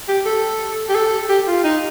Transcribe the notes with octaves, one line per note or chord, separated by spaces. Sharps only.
G4
A4
G4
A4
G4
F4
D#4